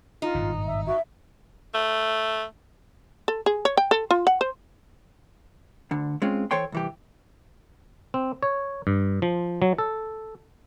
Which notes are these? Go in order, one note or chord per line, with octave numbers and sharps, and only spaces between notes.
D#4 F4
G#1 G2 A#2
E5
F#4 E5
A3
A4
G#4
C#5
G5
A4
F4
F#5
C5
D2 D3
G#3 C4 C#4 F4
E3 A4 C5 C#5 G5 C6
C2 E3 G4
C4
C#5
G2
F3
F#3
A4